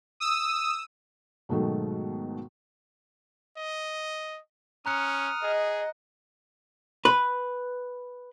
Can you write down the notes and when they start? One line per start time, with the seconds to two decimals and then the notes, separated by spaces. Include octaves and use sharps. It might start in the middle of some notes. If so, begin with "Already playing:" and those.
0.20 D#6 E6
1.49 G#2 B2 D#3 F#3 A3
3.57 D#5
4.86 C#4 A#5 D#6 F6 F#6 C#7
5.43 G#4 D#5
7.05 B4